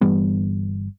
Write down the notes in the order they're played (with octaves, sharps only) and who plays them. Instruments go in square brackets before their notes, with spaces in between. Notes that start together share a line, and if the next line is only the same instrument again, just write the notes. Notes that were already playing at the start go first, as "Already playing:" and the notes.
[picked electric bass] G1 E3 G3 B3